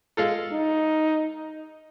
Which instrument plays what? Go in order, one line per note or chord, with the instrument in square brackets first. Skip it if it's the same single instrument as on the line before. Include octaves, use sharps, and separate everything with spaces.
[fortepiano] G#3 F4 A4
[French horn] D#4